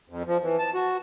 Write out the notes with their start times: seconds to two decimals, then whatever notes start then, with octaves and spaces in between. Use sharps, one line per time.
0.09 F2
0.27 F3
0.43 E3
0.59 A5
0.74 F#4